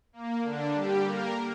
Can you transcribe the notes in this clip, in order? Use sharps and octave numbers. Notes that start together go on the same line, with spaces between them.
A#3
D3 D4
G3 G4
A#3 A#4